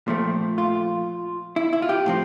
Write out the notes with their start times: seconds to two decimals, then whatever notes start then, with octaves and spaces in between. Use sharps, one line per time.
0.08 A#2 F3 A3 C4
0.58 F4
1.56 E4
1.73 E4
1.82 F4
1.89 G4
2.06 A2 F3 C4